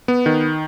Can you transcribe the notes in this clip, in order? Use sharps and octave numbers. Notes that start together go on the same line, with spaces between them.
B3
D#3